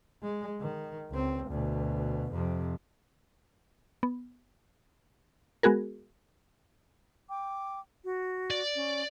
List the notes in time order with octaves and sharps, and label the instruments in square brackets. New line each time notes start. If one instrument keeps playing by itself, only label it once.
[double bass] G#3
D#3
C#2 C4
D2 B2
F2 C3
[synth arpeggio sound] B3
G#3 B3 F#4 G#4 A#4
[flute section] G5 D6
F#4
[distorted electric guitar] D5
[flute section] C#4